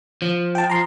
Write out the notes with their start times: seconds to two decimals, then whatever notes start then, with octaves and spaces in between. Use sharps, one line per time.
0.22 F3
0.55 G5 A5
0.70 A#5 C6